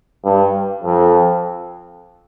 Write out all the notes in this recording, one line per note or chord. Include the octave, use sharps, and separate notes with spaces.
G2
F2